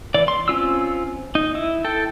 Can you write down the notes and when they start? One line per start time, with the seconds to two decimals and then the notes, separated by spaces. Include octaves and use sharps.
0.14 E3 D5
0.28 C6
0.48 C4 C#4 F4 E6
1.35 D#4
1.55 E4
1.85 A4 G5